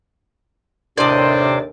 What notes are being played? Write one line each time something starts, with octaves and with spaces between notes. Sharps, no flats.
D#2 A2 C3 D4 C5 D5 D#5 D6